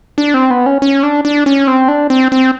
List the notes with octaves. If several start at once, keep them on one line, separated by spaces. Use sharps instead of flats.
D4
C4
B3
C#4
C#4
D4
D4
C#4
C4
D4
C4
C4